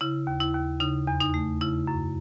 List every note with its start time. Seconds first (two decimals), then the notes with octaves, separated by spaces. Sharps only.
0.01 C#3 E4
0.27 D#2
0.40 E4
0.54 D#2
0.80 C#3 D#4
1.07 E2
1.21 D#4
1.34 A3
1.61 C#3 E4
1.87 F#2